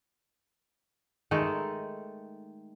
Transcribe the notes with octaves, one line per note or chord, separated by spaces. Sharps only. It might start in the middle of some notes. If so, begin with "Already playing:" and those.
D#3 G#3 A3 A4